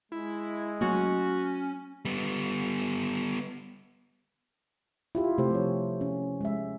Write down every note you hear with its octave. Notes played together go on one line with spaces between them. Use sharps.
G#3 E4
F#3 A3 A#3 C#4 F#4
G3 B3
E4 F4 G4
C3 A3 G4 C5
F3 C#5
C#4
G#3 E5